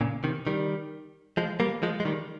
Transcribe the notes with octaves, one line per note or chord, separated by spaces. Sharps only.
A#2 C#3
C3 D#3
D#3 G3
F3 G#3
G3 A#3
F3 G#3
G#3
D#3 G3